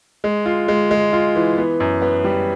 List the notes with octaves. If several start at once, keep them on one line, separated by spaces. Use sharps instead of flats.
G#3
F4
G#3
G#3
F4
E3
B3
F#2
B3
G3